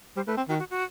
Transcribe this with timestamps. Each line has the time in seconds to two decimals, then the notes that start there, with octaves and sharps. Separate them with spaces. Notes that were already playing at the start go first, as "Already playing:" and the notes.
0.16 G3 C5
0.27 A3 B4
0.37 C4
0.49 D#3 F#4
0.59 F#4
0.70 F#4